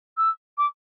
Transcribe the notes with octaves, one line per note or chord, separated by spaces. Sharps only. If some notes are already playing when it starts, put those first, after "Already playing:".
E6
D6